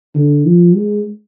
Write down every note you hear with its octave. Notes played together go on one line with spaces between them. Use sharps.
D3
F3
G#3